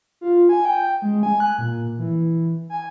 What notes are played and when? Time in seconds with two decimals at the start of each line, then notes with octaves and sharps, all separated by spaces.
0.21 F4
0.49 G#5
0.65 G5
1.02 G#3
1.23 G#5
1.40 F#6
1.58 A#2
1.99 E3
2.70 G#5